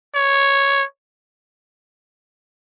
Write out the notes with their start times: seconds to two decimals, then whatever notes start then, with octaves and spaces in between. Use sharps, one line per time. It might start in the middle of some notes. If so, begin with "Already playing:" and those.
0.15 C#5